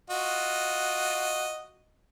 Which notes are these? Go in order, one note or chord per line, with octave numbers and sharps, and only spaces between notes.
F4 F#4 D#5